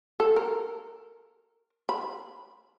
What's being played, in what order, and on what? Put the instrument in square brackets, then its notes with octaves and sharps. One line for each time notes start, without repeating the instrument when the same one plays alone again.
[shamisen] A4
A#4
B5